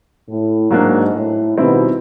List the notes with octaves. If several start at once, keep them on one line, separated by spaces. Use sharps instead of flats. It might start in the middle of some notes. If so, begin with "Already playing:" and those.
A2
G#2 F#3 A#3 D4
A2
B2 D#3 G3 C4 E4